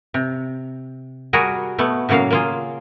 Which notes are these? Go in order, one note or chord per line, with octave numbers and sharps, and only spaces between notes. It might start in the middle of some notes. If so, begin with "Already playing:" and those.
C3
G3 F#4 G#4 A#4
B2 A3 B3
A2 C#3 F#3 A#3 F5
A#3 F4 G#4